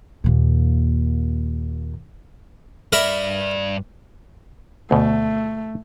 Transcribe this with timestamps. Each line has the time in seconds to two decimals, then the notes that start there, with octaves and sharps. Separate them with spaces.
0.24 D#2 A#2
2.93 G2 A#4 D5 E5 B5
4.91 D2 B2 A3